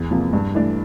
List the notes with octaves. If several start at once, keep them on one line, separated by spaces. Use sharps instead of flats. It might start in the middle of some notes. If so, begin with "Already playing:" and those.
Already playing: E2
C3 F3 A#3
G2
E3 A3 D4